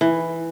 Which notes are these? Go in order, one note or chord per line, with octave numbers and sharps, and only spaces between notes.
E3